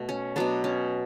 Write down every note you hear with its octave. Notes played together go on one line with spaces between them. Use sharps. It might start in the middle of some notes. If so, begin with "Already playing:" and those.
Already playing: B2 A3
C#4
B2 F#3 B3 D4
C#4